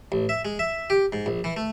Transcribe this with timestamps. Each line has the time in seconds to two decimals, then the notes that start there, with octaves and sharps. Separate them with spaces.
0.12 A1
0.29 E5
0.45 G#3
0.59 E5
0.90 G4
1.13 G#2
1.26 A#1
1.44 E3
1.57 A3